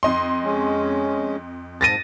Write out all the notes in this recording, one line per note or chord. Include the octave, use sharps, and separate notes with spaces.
F2 D#5 C6
G#3 C#4
G#2 A5 A6 A#6 D#7